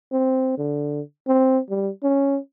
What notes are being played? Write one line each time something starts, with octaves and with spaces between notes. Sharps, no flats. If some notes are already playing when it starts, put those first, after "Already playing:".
C4
D3
C4
G3
C#4